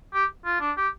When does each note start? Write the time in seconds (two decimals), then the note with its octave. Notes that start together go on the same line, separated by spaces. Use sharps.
0.14 G4
0.45 F4
0.61 D4
0.77 G4